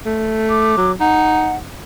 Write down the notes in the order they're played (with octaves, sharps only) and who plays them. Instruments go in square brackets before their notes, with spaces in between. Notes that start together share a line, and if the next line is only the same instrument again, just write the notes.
[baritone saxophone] A3
[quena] D6
[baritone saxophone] F#3
[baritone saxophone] D#4 [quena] F#5